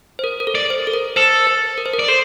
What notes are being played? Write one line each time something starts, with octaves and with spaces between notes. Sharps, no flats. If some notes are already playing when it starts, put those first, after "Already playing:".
C5
A#4
A#4
A4
D5
C5
A4
A#4
A4 C5
C5
A#4
C5
A#4
D5
A4 C5